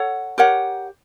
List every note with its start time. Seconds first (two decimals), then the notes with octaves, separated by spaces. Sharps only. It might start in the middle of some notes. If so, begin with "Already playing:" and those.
Already playing: A4 C#5 F#5
0.38 G4 A#4 C#5 F#5